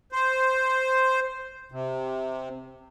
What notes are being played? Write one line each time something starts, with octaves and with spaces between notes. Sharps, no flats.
C5
C3